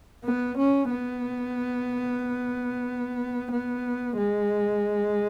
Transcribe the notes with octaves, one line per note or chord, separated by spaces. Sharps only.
B3
C#4
B3
B3
G#3